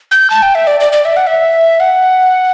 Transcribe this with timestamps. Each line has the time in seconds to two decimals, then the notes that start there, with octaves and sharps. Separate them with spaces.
0.11 G6
0.30 A5
0.42 G5
0.55 E5
0.67 D5
0.80 D5
0.93 D5
1.05 E5
1.17 F#5
1.27 E5
1.80 F#5